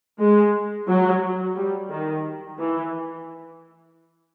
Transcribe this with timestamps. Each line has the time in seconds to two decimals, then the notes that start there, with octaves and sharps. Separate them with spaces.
0.20 G#3
0.88 F#3
1.56 G3
1.90 D#3
2.59 E3